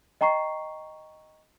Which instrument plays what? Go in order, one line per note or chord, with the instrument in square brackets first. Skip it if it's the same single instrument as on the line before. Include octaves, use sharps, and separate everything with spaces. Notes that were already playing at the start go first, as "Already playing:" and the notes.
[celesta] D#5 G5 A#5 C#6 C7